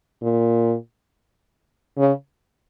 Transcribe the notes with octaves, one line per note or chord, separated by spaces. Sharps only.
A#2
C#3